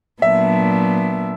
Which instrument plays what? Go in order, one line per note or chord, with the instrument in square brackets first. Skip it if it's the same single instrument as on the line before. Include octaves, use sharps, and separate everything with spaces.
[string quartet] A#2 F#3 B3 D4 [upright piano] E5